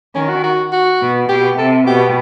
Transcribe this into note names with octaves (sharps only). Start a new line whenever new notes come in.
D#3 C#4
F#4
F#4
F#4
B2
B2 G4
C3 A4
B2 G4